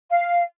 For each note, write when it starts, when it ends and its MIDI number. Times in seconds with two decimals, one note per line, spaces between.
0.10 0.42 77